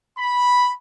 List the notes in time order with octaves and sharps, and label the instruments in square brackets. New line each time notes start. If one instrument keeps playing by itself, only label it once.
[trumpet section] B5